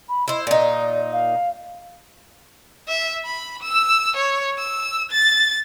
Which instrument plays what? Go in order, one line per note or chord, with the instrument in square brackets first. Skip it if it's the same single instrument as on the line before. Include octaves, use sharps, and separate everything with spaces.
[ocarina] B5
[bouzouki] E4 C5 [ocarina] D#5
[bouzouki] A#2 D#4 [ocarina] D5
[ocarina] F5
[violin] E5
B5
E6
C#5
E6
A6